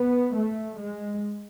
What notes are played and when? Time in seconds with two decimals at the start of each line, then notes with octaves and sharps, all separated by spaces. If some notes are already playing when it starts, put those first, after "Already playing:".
Already playing: B3
0.34 A3
0.78 G#3